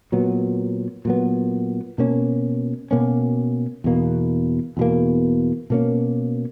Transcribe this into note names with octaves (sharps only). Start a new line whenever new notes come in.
A#2 F#3 B3
A#2 F#3 B3
B2 A#3 C#4
B2 A#3 C#4
E2 B2 A#3
E2 B2 A#3
B2 A#3 C#4